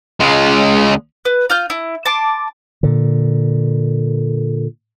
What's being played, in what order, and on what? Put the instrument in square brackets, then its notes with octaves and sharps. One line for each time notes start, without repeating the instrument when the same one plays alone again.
[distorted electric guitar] C#2 G#3
[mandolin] B4
F4 F6 G6
E4
A5 C6 D6
[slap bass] A#2 D3